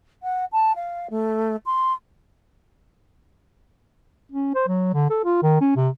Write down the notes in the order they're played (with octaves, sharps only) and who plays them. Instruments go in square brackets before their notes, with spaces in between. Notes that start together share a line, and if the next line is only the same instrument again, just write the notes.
[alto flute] F#5
A5
F5
A3
C6
[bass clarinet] C#4
C5
F#3
D3
A4
F4
D#3
C#4
C3